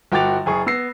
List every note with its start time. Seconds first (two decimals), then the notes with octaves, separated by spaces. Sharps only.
0.12 G1 F#4 G5 D6 A6 F7
0.46 F#1 G#4 C#6
0.66 B3 E6 A#6 C7